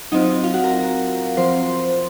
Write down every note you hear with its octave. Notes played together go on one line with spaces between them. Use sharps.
F#3 C4 D#4 F4 D#5
F4 F5
F#4 F#5
A#4 A#5
F3 C4 F4 C5 C6